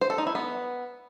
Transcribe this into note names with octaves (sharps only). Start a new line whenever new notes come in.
C5
A4
D#4
E4
B3